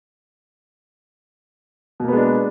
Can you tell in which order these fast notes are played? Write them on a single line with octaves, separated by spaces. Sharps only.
B2 A#3 B3 G#3 D4